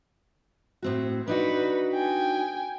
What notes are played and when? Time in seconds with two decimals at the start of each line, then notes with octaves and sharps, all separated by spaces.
0.82 A2 C4 F#4
1.28 D4 D#4 F#4 B4
1.94 G5 G#5